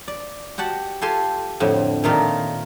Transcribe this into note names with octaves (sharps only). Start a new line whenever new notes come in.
D5
F#4 G4 F#5 A5
F4 G4 A4 G#5 A5 C6
F2 A2 D3
A#2 D#3 A3 D#4 F4 A#4